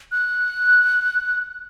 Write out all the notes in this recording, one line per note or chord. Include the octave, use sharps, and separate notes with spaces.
F#6